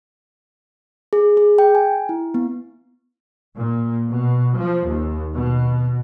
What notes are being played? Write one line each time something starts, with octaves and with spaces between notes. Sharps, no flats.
G#4
G#4
G5
G#5
E4
B3
A#2
B2
F3
D#2
B2